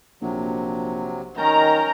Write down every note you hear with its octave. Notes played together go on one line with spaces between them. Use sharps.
A#1 C3 F#3
D#3 C#4 A#4 A#5 G6